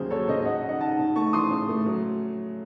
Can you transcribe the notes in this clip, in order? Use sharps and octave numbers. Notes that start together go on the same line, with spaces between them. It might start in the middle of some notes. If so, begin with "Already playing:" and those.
Already playing: D#2 C#3 F#3 G#4 C5
F#3 A4 C#5
C#3 C5 D#5
C#3 D#5 F#5
D#4
D#5 F#5
D#4 F#5 A5
C#3
A3 A5 C#6
E3 C6 D#6
C#3
A3
F#3